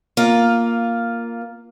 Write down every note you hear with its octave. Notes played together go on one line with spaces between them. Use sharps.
A#3 F4